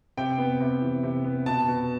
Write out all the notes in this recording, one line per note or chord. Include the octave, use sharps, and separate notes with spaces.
C3 G5
B3
C3
E3
C3
B3
B2 A5
B2